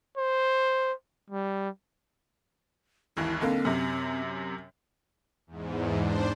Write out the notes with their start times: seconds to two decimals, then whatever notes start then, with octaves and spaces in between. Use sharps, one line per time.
0.17 C5
1.30 G3
3.17 G#1 D#2 E3 E4
3.41 B1 D3 A#3 C4
3.65 F#2 C3
5.47 E2 G#2
5.98 D4 C5